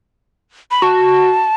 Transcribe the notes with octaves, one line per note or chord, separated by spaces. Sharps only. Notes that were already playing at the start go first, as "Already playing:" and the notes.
B5
F#4 A5